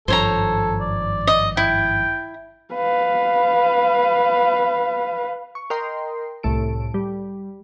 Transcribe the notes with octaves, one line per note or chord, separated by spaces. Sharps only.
G#1 G2 F3 A4 C5 C#5 A#5
D5
D#5
E4 G5
B4 F5
C#6
A#4 D#5 G5 C6
C2 A2 A4 D7
G3